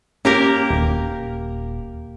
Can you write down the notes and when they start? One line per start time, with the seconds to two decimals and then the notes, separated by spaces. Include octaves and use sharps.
0.25 A#3 C#4 G4 A#4
0.70 D#1